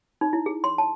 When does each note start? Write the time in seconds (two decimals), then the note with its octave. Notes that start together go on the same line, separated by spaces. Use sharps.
0.21 D#4
0.33 E4
0.46 G#4
0.64 C6
0.78 A5